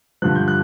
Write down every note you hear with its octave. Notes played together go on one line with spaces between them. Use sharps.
G2 D3 F3 F#6
G6
F#6